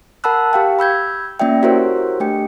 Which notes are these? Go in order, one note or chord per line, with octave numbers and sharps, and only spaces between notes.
A#4 F#5 A5 B5 E6 F#6
G4 F5 G5
B5 E6 G6 G#6
A#3 C#4 F4 D5 E5 G5
E4 F#4 G4 A#4 C5 C#5
A3 D4 G4 G5 C#7